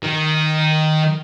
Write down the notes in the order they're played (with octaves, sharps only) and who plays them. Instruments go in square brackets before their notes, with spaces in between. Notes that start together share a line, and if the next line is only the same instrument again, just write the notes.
[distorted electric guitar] D#3